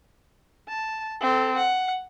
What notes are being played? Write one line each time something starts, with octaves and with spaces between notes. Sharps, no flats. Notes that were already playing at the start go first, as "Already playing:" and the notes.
A5
C4 A4
F#5